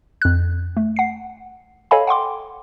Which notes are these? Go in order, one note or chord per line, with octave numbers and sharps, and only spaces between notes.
F2 F#6
A3
F#5 C7
A4 C#5 D#5 F5 G#5 B5
F#5 G5 C6 D6